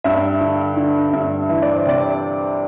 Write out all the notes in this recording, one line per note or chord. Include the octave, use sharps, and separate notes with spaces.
G2 E5
D3
D3
G2 E5
E3 E5
D5
C5
C3 D5